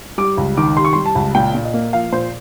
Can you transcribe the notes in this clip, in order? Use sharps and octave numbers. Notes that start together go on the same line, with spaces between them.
G3 D6
C#2
D#3 D6
C3 C6
C#6
G3 C6
A5
C#2
A#2 G5
A#2
D#5
A#3
F3 F5
A#2 C5